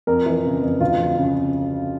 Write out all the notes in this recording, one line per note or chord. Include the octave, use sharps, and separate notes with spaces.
F2 A#4
E3
C#3
F2
D2 F4
F3
C#3